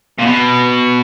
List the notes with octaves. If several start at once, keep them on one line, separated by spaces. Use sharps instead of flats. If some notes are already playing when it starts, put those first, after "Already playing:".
A#2
B2